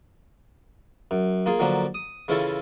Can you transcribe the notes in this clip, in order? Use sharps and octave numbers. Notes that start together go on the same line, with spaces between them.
F#2
A#3 F4 G#4
D3 F3 F#3 A#3 D4
D#6
C#3 E3 C#4 E4 F4 A4